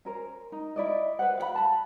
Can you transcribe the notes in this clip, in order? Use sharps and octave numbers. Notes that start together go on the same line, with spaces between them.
C#4 A#4 C5
D#4
E4 D5 D#5
B4 C5 F#5
F5 F#5 B5
A5 B5